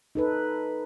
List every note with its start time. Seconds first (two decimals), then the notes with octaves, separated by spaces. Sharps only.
0.15 D#4 A4 B4